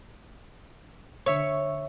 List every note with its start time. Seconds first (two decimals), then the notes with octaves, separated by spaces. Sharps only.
1.26 D3 C#5 E5 C#6